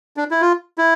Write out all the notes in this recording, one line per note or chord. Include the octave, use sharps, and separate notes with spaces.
D4
E4
F4
E4